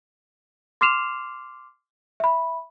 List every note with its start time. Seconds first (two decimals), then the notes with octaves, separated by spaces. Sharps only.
0.81 C6 D6 F6 C7 E7 F7
2.20 E5 B5